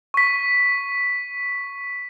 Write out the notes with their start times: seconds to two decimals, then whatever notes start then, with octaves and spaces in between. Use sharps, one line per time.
0.14 C#6 B6